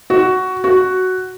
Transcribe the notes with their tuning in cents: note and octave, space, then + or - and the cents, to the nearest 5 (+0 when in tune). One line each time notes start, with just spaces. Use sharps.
F#4 +10
F#4 +5